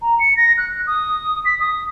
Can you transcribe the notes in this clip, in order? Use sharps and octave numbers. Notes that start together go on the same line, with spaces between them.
A#5
C#7
A#6
F#6
D#6
B6
D#6